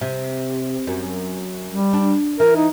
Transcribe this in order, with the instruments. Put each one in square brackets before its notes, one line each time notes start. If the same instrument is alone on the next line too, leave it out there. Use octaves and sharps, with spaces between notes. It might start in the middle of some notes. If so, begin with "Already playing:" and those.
[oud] C3
F#2
[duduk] G3
[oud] D4
[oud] E3 [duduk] A#4
[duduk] D#4